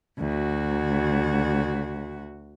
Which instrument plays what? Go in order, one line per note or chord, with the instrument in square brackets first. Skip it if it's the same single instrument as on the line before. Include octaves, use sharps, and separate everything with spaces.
[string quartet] D2 F#4